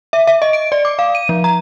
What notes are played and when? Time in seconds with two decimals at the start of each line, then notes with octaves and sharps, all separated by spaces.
0.13 E5
0.27 E5
0.42 D#5
0.53 D7
0.72 D5
0.85 D6
0.99 F5
1.15 D#7
1.29 F3
1.44 A#5